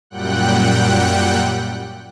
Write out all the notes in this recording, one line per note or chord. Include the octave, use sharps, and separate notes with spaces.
F#2 A#2 G3 F#5 G5 F#6